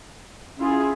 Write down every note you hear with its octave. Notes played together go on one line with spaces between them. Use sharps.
C#4 E4 F4 G#4